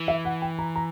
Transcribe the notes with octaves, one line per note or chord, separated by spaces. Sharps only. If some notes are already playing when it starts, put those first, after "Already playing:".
Already playing: E3
E5
F#5
G5
A#5
A#5